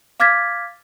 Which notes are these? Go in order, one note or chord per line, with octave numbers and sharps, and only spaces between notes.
F5 D6 F6 G#6 A6 B6